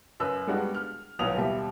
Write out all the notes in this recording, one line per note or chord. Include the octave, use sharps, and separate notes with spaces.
F#2 B4 E6
G3 G#3 B3 D4 F#4
F6
D#1 B1 F#3 B3 D#6 F7
D#2 B2 G3 E5